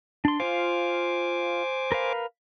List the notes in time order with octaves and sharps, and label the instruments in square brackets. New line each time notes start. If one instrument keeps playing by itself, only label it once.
[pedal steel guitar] D4 C6
[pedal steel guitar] F4 F5 [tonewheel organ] C5 G#5 D6
[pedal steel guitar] A#4 B4 F5